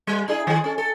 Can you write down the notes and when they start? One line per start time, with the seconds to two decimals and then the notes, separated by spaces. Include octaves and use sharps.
0.07 G3
0.28 D4 E4 G#4
0.47 D#3 G#4
0.64 C#4 A4
0.78 A4